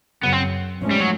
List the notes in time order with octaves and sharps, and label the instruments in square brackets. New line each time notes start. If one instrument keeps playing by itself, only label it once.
[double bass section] F#2 C#3 F#3 [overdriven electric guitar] B3
[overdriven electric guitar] C4
[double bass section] G#2 F3 A3 C#4
[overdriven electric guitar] G3
F#3